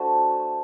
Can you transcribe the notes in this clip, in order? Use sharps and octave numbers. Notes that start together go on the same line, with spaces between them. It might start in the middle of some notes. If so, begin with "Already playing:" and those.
Already playing: A3 D4 F#4 C5